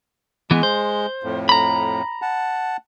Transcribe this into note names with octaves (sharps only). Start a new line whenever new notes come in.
E3 G#3 B3
C5
F2 A2
A#5 B5
F#5 A5